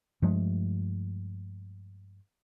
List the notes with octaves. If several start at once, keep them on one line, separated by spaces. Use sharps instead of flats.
G2 F3 G#3 A3